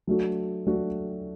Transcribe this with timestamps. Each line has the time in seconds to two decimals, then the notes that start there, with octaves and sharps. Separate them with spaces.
0.07 F#3 A3 D4 F#4
0.66 F#3 A3 D4 F#4